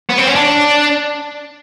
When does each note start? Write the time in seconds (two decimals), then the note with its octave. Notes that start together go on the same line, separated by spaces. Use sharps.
0.09 B3
0.18 C4
0.27 C#4
0.35 D4